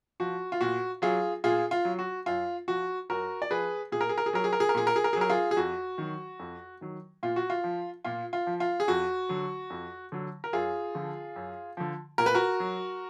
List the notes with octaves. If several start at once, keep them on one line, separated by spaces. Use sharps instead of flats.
F3 F#4
F4
A#2 F#4
F#3 F4 G#4
A#2 F4 G#4
F4
F#3
F#4
F#2 F4
F3 F#4
F#2 F#4 A#4
D5
F3 G#4 B4
A#2 G#4
A#4
G#4
A#4
G#4
F#3 A#4
G#4
A#4
G#4
A#4
A#2 G#4
A#4
G#4
A#4
F#3 G#4
A#4
F4 G#4
G#4
F2 F#4
D#3 F#3
F2
D#3 F#3
A#2 F4
F#4
F4
F3
A#2 F4
F4
F3
F4
G#4
F2 F#4
D3 F#3
F2
D3 F#3
A#4
F#2 F4 G#4
D3 F3
F#2
D3 F3
A#2 A#4
B4
F#4 A#4
F#3